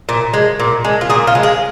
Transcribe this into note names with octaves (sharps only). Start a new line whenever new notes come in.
A#2
G#3
A#2
G#3
F4
A#2 G#4
F4
G#3
G#4